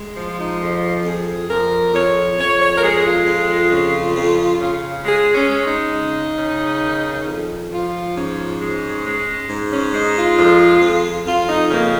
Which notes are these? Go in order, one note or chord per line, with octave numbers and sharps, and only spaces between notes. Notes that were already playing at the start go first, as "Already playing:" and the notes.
Already playing: G#3
F3 F4
D#4
F2 F4
F2 G#4
F2 A#4
F2 C#5
F2 C#5
C#5
A#4
G#3 G#4
F4
F2
C#3
F2
C#3
G#3 G#4
C#4
G#3
D#4
C#3
C#3
D#3
F2
F3 F4
G#2 C#4
G#3
G#3
G#2
C#4
G#3 D#4
F4
F2
F2
F2 F4
D#4
C#3 A#3